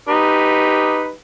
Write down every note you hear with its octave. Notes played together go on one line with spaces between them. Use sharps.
D#4 G4 B4